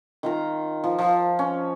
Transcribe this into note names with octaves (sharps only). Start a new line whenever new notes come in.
D#3 F4 A#5
F3
F3
C#4